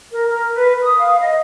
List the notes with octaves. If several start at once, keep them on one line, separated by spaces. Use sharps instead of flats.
A#4
A#4
B4
D#6
F5
D#5